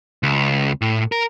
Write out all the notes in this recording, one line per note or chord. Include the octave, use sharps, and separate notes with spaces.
C#2
A2
A#4